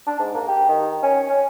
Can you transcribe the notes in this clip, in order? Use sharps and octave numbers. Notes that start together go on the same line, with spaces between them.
D4
G#2
A#3
G4
D#3
C#4
C#4